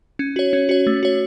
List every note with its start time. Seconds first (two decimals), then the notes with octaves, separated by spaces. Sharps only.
0.19 C#4
0.36 F#4 C#5
0.53 C#4
0.69 F#4 C#5
0.87 A3
1.03 F#4 C#5